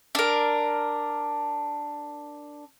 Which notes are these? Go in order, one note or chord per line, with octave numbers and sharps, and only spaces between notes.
D4 A#4